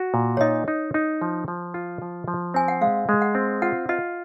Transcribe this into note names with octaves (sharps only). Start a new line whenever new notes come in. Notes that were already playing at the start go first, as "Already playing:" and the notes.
Already playing: F#4
A#2
C#5
D#4 D#5
D#4
D#4
F3
F3
F4
F3
F3
C4 G#5
F#5
G#3 F5
G#3
F#5
C4
F4 F#5
F4 D#5